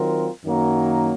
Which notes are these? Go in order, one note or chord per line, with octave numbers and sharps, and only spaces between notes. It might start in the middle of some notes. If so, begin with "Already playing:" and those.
Already playing: D#3 F#3 C4 F4 A#4
F#2 D#3 F#3 A#3